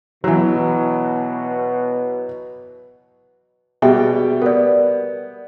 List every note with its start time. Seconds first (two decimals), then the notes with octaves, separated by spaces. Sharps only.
0.24 B2 E3 F#3
3.82 B2 G3 G#4 E5 G5
4.42 B3 A#4 D5